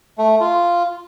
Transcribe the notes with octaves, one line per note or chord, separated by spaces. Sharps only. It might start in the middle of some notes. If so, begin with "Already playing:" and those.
A3
F4